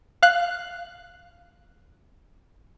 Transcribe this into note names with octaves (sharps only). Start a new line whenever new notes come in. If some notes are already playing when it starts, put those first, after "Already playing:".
F5 F#6